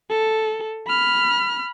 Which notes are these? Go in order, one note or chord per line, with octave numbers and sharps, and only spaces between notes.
A4
B5 F6